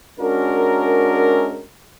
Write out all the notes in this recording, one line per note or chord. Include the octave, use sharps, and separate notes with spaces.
G#3 C#4 D4 F#4 A#4